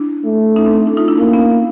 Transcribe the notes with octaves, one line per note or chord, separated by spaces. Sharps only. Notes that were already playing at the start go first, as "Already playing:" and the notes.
Already playing: D4 E4
A3
C#4 D#4
C4 D4
D4 E4
D#4 F4
D4 E4
A#3 C#4 D#4
B3 C#4